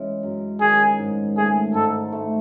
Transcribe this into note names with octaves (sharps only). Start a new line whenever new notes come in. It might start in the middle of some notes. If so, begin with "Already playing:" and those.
Already playing: E3 G#3 C#4
F#2
D#3 G#4
G#2
A3 G#4
G#2 A4
A3